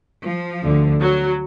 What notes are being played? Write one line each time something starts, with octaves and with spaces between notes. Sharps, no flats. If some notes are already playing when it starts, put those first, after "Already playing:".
F3
D2 D3
F#3